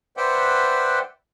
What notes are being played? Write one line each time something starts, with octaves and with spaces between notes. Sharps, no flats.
B4 C5 D5 E5 F#5 G5